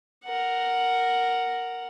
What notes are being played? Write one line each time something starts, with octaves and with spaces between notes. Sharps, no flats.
A#4 F#5